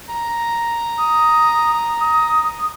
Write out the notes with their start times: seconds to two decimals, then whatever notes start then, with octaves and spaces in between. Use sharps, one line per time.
0.09 A#5
0.98 D#6
2.00 D#6